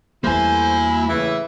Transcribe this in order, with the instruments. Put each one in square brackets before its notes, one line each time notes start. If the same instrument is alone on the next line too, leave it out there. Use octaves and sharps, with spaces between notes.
[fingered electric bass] E2 G3 [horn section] E3 A3 C5 [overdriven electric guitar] A#3 G#5 [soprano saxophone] E4
[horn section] A2 C#3 E3 [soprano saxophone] E5